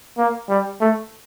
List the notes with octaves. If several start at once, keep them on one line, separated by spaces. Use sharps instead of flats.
A#3
G3
A3